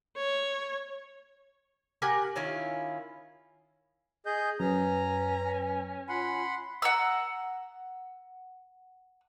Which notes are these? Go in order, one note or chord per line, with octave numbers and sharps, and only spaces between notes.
C#5
G4 A#4 F#5 G#5
D#3 C#4 E4 F4
G#4 D#5 G6
F#2 C#4 B4 A#5
F4 F#5 B5 C6
F#5 A#5 E6